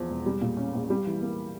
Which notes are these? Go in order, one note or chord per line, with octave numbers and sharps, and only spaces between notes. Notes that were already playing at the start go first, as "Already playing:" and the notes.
Already playing: E2 F3
E1
G3
A#2
C#4
A#1
G3
E3
A#3